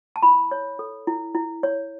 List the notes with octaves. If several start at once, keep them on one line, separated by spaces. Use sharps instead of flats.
A5
E4 B5
C#5
A4
E4
E4
C#5